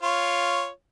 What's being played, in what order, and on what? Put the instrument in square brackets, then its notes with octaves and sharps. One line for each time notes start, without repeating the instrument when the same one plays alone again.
[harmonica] F4 C#5